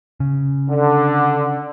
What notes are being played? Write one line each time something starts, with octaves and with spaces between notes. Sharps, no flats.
C#3
D3